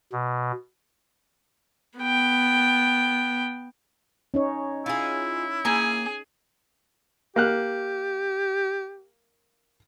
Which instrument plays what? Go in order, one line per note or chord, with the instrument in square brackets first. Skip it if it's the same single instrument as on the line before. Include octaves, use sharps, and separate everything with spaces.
[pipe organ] B2
[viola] B3 G5
[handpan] C#4 D#4 C#5
[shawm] E4 [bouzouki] F4 G#4
[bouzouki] A#3 G5 G#5 [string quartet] G#4
[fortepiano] A#3 F6 F#6 [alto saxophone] G4